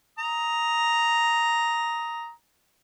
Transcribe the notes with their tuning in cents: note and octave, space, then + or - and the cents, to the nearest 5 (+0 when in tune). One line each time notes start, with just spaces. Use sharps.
A#5 +0 D#6 +15